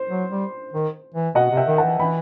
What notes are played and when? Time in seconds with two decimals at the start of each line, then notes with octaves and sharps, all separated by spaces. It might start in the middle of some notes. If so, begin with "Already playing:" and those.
Already playing: C5
0.10 F#3
0.30 G3
0.73 D#3
1.15 E3
1.35 B2 D#5 F#5
1.51 C3
1.57 E5 G5
1.67 D#3
1.78 F#5 A5
1.83 E3
1.99 E3 G5 B5